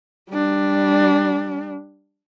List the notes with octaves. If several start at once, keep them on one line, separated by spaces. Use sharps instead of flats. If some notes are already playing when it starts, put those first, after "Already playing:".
G3 D4